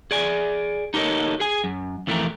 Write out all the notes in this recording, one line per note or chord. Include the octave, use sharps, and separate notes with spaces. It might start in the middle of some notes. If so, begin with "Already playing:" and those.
G#4 D5 G#5
D#4 G4 A4 A#4 C#5 D#5
G#4 G#5
F#2
F2 E3 A3 C#4 G4 A#4